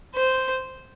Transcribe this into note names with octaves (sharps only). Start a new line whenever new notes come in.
C5